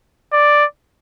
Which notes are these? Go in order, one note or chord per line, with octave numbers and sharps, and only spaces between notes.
D5